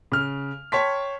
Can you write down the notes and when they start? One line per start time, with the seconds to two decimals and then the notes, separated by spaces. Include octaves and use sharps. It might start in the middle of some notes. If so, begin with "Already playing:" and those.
0.12 C#3 F6
0.72 C#5 G5 A5 C6 B6